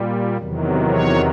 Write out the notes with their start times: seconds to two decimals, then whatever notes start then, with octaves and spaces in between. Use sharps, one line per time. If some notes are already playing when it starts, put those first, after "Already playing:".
Already playing: A#2 G3
0.37 E2 C3 D#3 F#3
0.90 C#5